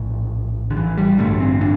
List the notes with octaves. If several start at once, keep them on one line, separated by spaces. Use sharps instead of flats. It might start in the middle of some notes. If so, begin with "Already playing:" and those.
Already playing: A#1 A2
D3
E3
G3
A1 G2 D3 A3
C4
D4